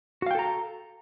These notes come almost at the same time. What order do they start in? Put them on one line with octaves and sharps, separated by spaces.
F#4 F5 G5 A4 A#5